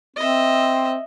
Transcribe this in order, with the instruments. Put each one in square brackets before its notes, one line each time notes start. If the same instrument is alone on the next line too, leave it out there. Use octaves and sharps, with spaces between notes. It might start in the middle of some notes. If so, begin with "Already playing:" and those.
[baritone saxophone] C4 [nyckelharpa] D#5 E5